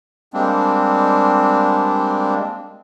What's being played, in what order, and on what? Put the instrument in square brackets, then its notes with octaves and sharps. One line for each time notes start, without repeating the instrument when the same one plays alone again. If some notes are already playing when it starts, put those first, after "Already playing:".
[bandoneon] G3 G#3 A#3 C4 D4